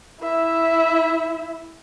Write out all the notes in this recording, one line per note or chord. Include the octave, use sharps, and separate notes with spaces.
E4 E5